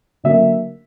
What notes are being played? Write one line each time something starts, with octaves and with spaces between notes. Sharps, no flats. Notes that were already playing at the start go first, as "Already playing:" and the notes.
D3 F#3 A#3 E5